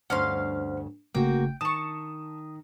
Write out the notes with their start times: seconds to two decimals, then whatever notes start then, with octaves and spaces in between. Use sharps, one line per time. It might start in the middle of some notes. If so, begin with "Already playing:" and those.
0.10 D2 G2 C#4 C5 F5 F#5 C6
1.15 G1 C#3 A3 A#3 F#4 G5
1.61 D#3 A5 C#6 D#6